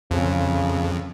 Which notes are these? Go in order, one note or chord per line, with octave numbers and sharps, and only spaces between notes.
F2 C#3